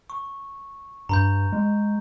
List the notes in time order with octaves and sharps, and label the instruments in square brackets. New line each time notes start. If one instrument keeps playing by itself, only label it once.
[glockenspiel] C#6
[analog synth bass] G2 [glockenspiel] A#5 B5 G6
[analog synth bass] G#3